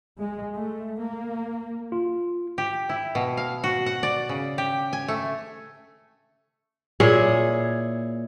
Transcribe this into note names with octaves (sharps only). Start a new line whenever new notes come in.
G#3
A3
A#3
F4
G4
E4
B2
F5
F#4
F#5
D5
C#3
G4
G#5
A3
A#2 E4 G#4 C#5